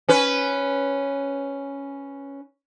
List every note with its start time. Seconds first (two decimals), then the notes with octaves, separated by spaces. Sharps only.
0.09 C#4 B4